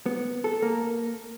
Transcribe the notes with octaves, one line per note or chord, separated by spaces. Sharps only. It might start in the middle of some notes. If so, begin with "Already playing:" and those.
B3
A4
A#3